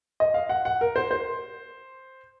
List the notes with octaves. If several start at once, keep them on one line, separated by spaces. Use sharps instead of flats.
D#5
F5
F#5
F#5
A#4
C5
C5